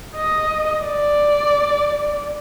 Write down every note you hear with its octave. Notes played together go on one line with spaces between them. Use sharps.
D#5
D5